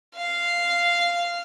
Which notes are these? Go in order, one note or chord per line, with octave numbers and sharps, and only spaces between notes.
F5